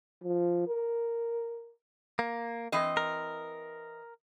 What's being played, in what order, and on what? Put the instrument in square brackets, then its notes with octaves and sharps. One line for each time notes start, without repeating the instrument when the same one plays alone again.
[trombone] F3
A#4
[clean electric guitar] A#3
[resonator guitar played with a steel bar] E3 C4 D#5
[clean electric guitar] A#4